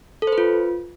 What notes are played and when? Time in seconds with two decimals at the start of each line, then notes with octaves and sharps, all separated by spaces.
0.22 A4
0.27 C5
0.32 B4
0.38 F4